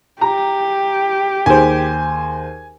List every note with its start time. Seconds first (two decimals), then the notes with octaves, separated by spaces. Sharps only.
0.21 G4 A#5
1.46 D#2 G#4 C5 G#5